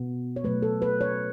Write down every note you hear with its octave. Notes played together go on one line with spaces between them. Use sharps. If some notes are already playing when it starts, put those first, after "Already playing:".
Already playing: B2 B3
C#5
B2 F#3 A3 B4
A4
B4
C#5